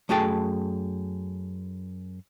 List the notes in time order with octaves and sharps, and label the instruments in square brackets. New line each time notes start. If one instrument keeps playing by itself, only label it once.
[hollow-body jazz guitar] F#2 A3 F#4 G#4 G5 A5